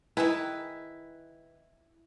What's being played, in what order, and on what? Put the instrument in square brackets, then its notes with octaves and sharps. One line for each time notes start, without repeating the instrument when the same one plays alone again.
[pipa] D#3 G#4 B4 [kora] E4